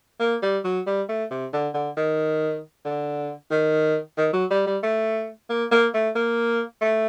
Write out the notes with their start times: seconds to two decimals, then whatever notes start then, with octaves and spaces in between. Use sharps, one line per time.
0.20 A#3
0.43 G3
0.64 F#3
0.87 G3
1.09 A3
1.31 C3
1.53 D3
1.74 D3
1.97 D#3
2.85 D3
3.51 D#3
4.18 D#3
4.33 F#3
4.51 G3
4.66 G3
4.83 A3
5.49 A#3
5.71 A#3
5.94 A3
6.15 A#3
6.81 A3